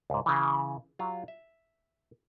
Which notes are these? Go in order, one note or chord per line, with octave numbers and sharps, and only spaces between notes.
C#2 G#2
C#3 E3
F#3 F4 G4
E5